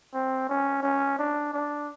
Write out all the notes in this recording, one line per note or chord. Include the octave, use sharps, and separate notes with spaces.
C4
C#4
C#4
D4
D4